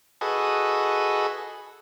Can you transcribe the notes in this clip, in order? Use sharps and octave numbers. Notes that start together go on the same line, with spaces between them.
F#4 G#4 A4 B4 D#5